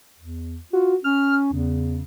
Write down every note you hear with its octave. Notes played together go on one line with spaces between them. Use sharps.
E2
F4 F#4
C#4 F6
E2 C#3